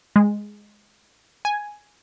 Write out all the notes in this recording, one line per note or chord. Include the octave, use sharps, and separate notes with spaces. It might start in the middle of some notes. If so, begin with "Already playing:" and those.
G#3
G#5